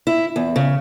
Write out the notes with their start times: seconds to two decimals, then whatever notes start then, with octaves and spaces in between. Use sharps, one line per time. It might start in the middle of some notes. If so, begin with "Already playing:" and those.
0.07 E4
0.36 E2
0.56 C#3